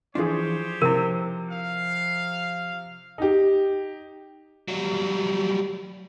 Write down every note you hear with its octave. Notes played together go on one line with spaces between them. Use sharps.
E3 F3 D4 F4 G4 G#4 C5 C#5
C3 F3 E4 A#4
F5
D#4 G4
F#3 G3